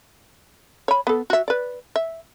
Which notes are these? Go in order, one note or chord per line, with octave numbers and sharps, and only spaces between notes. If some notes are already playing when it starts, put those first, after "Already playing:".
C#5 B5
B3 A4
F#4 E5
B4 D5
E5